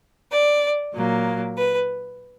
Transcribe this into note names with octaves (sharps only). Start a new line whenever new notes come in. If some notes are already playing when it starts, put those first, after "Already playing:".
D5
A#2 F#3 A#3
B4